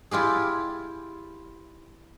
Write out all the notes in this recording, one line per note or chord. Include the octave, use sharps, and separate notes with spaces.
E4 F4 G4 G#4